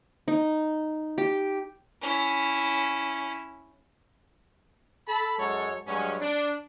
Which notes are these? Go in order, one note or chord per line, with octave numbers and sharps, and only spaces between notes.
D#4
G4
C#4 E4
A4 A5 B5
F#2 F#3 G#3 A4 C#5
G2 F#3 G#3 C#4
D4